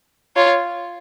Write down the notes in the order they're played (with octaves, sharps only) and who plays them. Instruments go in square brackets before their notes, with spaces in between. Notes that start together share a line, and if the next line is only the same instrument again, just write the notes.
[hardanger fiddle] F4 [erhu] C#5